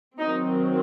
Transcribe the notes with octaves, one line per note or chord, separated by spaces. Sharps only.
D#3 F#3 C4 D#4